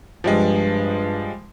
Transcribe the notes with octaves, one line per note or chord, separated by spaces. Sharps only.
G2 F3 G3 G#3